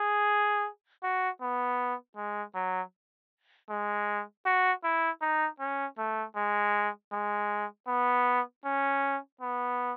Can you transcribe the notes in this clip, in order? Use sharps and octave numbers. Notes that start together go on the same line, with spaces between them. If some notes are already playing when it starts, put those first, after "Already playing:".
Already playing: G#4
F#4
B3
G#3
F#3
G#3
F#4
E4
D#4
C#4
A3
G#3
G#3
B3
C#4
B3